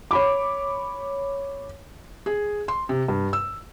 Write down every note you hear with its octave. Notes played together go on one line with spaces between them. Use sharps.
C#5 B5 D6
G#4
C6
C3
G2
E6